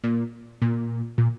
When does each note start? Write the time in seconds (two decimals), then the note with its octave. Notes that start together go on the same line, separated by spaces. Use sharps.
0.04 A#2
0.62 A#2
1.18 A#2